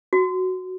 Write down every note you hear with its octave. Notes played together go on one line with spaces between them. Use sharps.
F#4